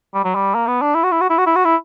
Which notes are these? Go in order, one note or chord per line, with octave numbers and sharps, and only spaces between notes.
G3
F#3
G3
A#3
B3
D4
E4
F#4
E4
F#4
E4
F#4
E4
F#4
E4